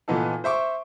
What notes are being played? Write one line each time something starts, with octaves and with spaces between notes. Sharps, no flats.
A#2 E3 B3 D#4 A4
C5 E5 C#6 D6